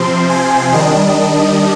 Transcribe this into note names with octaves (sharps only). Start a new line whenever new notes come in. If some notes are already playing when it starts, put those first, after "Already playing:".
Already playing: C3 F3 C4 C6
G#5
D#3 G3 D4 D#5